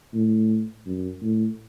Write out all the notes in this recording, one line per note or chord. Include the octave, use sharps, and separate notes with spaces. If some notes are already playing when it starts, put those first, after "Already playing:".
A2
F#2
A2